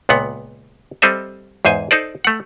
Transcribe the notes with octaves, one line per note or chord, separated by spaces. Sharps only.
C#2 A#2 B3 F#5
G3 C4 A4 D#5 E5
E2 G#2 C5 G#5
D#4 A4 C5 D5
A3 F#5